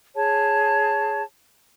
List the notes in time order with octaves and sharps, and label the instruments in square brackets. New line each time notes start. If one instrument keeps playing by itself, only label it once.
[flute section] G#4 C#5 A5